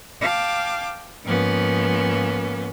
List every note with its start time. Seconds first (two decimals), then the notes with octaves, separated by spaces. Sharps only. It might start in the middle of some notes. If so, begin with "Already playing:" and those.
0.21 F5 G5 A5 D6
1.24 G#2 F3 A#3 B3 C#4